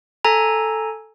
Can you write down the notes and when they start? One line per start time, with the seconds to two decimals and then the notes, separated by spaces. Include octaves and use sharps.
0.25 A4 G#5 A#5